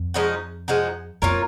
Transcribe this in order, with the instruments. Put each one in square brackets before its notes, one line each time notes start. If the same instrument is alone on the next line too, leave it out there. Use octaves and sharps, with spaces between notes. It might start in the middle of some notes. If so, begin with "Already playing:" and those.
Already playing: [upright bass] F2
[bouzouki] F3 G#3 D#4 F#4
F3 G#3 D#4 F#4
[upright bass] F2 [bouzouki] A#3 F4 A#4 C#5